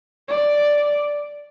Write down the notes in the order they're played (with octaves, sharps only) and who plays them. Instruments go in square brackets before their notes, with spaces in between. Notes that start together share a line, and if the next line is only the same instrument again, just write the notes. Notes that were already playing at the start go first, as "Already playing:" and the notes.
[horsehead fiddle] D5